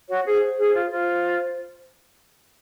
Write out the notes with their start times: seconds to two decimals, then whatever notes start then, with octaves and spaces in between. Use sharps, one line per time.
0.09 F#4 C#5
0.26 G#4 C5
0.58 G#4
0.74 F4
0.91 F4 C5